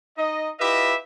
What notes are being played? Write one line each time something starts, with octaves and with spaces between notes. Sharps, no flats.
D#4 D#5
E4 F4 G4 B4 D#5 E5